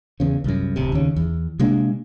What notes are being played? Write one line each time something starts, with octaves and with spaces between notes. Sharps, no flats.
E2 C#3
C2 F#2
D1 C3
D#2 C#3
E2
C3 G#3 A#3 D4